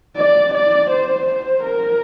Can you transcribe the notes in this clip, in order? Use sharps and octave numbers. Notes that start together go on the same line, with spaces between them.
D5
D5
C5
C5
A#4